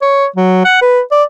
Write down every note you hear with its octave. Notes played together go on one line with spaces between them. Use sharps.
C#5
F#3
F#5
B4
D5